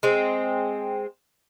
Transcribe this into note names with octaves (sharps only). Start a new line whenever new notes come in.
G#3 C4